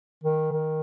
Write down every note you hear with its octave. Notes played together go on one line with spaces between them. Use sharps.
D#3
D#3